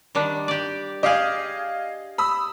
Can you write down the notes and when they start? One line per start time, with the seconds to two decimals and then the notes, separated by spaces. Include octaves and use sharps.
0.15 D#3 G3 D4
0.48 G4 D5
1.03 G4 G#4 D#5 F5 F6
2.18 B5 D#6 E6